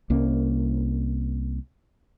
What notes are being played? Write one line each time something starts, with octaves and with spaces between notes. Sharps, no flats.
C2 A#3 C#4